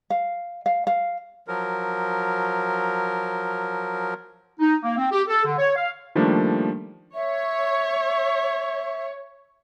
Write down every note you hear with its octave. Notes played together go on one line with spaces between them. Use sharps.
F5
F5
F5
F3 F#3 A#4
D#4
A#3
C4
G4
A4
D3
C#5
F5
D#3 F3 G3 A3 A#3 D4
C#5 E5